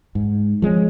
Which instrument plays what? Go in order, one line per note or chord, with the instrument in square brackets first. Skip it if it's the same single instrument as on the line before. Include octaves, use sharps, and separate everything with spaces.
[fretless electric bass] G#2
F3 G#3 C#4